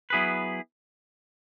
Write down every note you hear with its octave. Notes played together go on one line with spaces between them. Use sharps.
F#3 B3 E4 G#4 B4